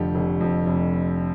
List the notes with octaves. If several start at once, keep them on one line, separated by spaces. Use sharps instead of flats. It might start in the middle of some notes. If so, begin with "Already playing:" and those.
Already playing: F1 F2 D3 G4
F1
F2
F1